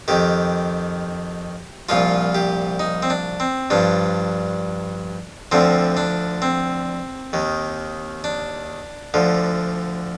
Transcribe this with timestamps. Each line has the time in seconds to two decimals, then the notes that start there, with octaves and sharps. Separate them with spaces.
0.08 F2 D#3 G4
1.89 C2 A#2 F3 F4
2.35 G4
2.80 D#4
3.03 C4
3.10 D4
3.40 C4
3.70 G2 F3 D4
5.52 D2 D3 F3 C4
5.97 D4
6.42 C4
7.33 D#2 D#3
8.24 D4
9.14 D2 D3 F3